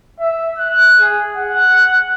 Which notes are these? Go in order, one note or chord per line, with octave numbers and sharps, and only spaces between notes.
E5
F#6
G#4
F#5